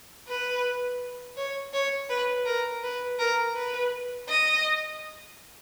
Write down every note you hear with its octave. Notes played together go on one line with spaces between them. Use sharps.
B4
C#5
C#5
B4
A#4
B4
A#4
B4
D#5